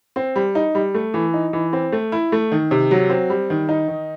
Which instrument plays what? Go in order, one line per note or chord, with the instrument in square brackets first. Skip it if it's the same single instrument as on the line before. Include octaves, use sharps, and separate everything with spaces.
[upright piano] C4
G3
D#4
G3
A3
E3
D#4
E3
C4
A3
E4
A3
D#3
C3
F#3
C4
G3
D#3
D#4
D#3